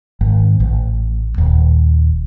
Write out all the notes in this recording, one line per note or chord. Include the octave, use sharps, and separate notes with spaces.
G#1
A1
D#1